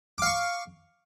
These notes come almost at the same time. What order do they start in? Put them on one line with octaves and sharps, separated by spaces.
D6 F5 C#6